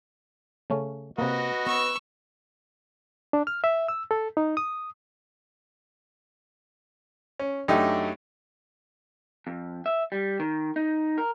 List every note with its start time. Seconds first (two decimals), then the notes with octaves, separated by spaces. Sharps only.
0.70 C#3 A3 C#4
1.18 C3 A#3 F#4 B4 D#5
1.66 B3 C#6 E6
3.33 D4
3.47 F6
3.64 E5
3.88 E6
4.11 A4
4.37 D#4
4.57 D#6
7.40 C#4
7.68 F#2 A3 D4 D#4 G4
9.47 F2
9.86 E5
10.12 G3
10.40 D#3
10.76 D#4
11.18 A#4